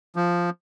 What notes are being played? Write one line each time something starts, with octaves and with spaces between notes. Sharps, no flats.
F3